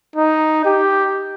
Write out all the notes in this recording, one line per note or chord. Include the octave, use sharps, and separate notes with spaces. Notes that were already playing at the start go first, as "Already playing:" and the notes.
D#4
G4